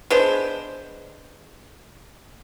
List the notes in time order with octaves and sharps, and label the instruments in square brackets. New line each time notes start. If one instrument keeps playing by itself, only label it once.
[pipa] G#3 B3 D4 C5